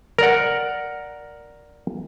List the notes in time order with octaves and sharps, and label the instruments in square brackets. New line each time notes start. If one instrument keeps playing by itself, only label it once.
[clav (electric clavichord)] A#4 D5 F#5